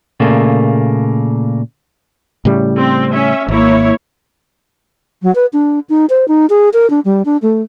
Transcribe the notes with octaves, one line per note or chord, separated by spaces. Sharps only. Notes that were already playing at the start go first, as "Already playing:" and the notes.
A#2 C#3 A3 A#3
A2 C#3 G3
C4
C#4 E5
G#1 A#3 E4 C#5
F#3
B4
D4
D#4
C5
D#4
G#4
A#4
D4
G3
D4
A3